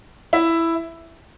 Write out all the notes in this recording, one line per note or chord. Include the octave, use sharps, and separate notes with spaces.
E4 E5